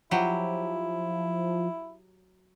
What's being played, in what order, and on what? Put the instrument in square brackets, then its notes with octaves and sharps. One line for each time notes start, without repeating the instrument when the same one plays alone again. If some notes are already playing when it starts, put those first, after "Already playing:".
[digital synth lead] F3 [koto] F#3 G4 [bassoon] E4